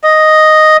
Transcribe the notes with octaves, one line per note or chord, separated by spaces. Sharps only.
D#5